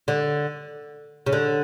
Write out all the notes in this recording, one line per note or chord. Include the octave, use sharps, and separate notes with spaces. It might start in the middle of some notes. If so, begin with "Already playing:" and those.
D3
C#3
D3